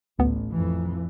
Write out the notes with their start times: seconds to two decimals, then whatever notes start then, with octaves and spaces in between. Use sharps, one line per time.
0.19 A1 D2 B3
0.50 F2 E3